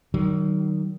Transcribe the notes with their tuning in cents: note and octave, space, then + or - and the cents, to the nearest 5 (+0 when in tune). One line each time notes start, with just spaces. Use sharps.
D#3 -10 F#3 +40